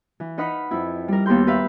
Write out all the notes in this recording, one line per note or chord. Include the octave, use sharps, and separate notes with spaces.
E3
D#4 B4 D#5 F#5 B5 F6
F2 E4
G3 A#4
D#2 B3 G4 A#4 C6 G6
G4 B4 E5 F5